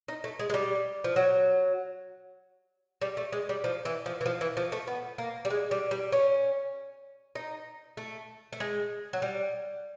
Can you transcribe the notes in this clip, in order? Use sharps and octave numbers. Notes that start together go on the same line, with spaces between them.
D#4
A3
G#3
G#3
G3
F3
F#3
G3
A3
G#3
G3
F3
E3
F3
E3
F3
E3
F3
A3
B3
A#3
G3
G#3
G3
G3
C#4
D#4
A3
A3
G#3
F#3
G3